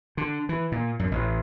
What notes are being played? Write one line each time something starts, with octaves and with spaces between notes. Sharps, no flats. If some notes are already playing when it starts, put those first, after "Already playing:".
D3
E3
A#2
F#2
A1